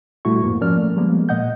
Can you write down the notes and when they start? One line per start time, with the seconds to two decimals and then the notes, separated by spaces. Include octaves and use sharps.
0.25 A#2 G3 A3 E4 F#4 C#6
0.42 F2 G#2 A#3
0.61 F3 C#4 A#4 D5 F6
0.78 A3 A#3
0.96 F3 G3 G#3 A#3 B3
1.29 A#2 D#5 F#5 G6